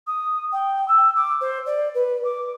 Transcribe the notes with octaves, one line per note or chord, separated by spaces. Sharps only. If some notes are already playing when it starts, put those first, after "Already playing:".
D#6
G5
E6
D6
C5
D5
B4
D6